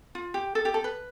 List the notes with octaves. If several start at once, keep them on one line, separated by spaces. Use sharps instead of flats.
F4
G4
A4
G4
A4
B4